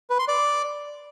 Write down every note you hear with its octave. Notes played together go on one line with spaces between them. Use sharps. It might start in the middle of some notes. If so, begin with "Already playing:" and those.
B4
C6
D5